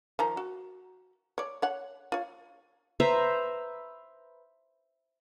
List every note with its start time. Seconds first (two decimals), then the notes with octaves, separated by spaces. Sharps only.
0.19 D#3 F3 A#5
0.37 F#4
1.38 C#5 D5
1.62 C#5 F#5
2.12 F4 C#5
3.00 B4 C5 E5 A#5